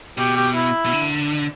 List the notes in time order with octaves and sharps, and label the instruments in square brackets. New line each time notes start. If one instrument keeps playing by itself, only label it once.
[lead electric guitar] B2 [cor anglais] G4
[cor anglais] G4
E4
[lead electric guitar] B2
D3